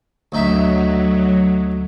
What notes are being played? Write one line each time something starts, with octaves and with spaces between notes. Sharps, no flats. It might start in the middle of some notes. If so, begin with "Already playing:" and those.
D2 F#3 D#4 E5